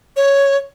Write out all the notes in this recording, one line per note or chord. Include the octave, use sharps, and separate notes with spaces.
C#5